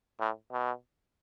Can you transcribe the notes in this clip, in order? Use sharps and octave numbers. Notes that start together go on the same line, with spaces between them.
A2
B2